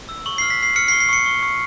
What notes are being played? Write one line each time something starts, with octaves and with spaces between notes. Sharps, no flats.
E6
C#6 F#7
F6 C7
B6
F6 C7
F6 C#7
C7
C#6
C7
C#6 C#7
C#6
C#6